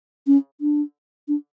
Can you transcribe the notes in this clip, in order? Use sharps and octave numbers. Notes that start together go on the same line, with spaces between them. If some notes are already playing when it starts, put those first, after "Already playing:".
C#4
D4
D4